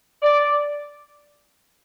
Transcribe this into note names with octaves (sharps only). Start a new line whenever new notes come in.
D5